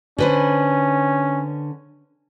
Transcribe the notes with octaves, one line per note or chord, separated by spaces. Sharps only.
D3 C#4 B4 C5